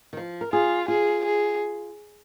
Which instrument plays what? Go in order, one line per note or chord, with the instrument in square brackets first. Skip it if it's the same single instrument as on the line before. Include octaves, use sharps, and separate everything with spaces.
[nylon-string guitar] D#3
F3
A#4
[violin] F4 [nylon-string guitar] G#4
[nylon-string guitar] F4 [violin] G#4
[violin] G#4